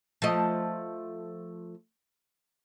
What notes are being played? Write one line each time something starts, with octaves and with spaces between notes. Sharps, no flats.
F3 A3 D#5